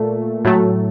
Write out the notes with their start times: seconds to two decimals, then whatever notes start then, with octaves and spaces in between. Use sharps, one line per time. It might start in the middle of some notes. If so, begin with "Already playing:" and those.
Already playing: A#2 A3
0.45 A2 F#3 A3